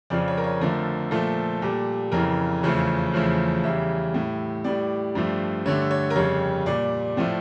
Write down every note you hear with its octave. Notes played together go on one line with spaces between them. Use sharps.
F2 C#3 F3 D5
C#5
A#4
C#5
F2 D3 F3 A3 A#4
A#2 F3 A3 A4
A#2 G3
F2 C#3 E3 A#4
E2 C#3 F3 A3
E2 C#3 F3 A3
E2 C#3 G3 E5
A2 G3
A2 G3 D5
G2 F3 A3
G2 D3 A3 C#5
C#5
A#4
F2 C#3 G3 C#5
A#2 G3 D5
A2 F3 A3